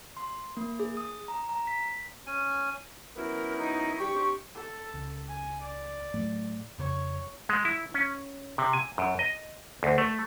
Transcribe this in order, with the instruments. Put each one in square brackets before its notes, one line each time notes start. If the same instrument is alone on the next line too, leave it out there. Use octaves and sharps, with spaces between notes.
[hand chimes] C6
A#3
G#4
D#6
A#5
A#5
B6
[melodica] C#4 G#5
[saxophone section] F#2 B3 E4 [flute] A#4
[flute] D#4
[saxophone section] G2 G4 [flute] C#6
[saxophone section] C4 D4 G4
[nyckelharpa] A4
[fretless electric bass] C#2
[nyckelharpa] G#5
D5
[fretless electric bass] A2 F#3 A3
[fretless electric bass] F2 C#3 [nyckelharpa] C#5
[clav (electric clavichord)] G#3
E4
C#4
C3
G#5
F#2
D#5
D2
A3